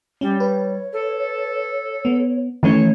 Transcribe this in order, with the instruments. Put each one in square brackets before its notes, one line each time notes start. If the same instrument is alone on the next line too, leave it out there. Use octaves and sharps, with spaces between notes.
[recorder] G3 [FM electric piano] C#4
[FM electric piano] B4 [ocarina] C#5
[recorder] A4
[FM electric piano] B3
[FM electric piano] D#3 A3 C#4 [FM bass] E3 [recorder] C#5